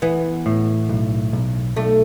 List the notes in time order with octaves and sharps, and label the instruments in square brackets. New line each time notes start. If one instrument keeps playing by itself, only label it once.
[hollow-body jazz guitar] E3 [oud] B3
[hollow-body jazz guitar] A2
B1
B1
[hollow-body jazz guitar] B1 [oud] A3